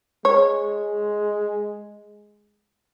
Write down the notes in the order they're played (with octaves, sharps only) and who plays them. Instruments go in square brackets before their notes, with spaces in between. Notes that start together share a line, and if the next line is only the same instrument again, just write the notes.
[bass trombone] G#3 [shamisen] C#5